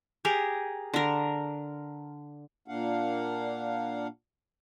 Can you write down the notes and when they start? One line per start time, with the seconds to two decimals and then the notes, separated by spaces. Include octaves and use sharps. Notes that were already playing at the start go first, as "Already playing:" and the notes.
0.25 G4 G#4 A#4
0.94 D3 A#4
2.68 A#2 A#3 D4 F5 F#5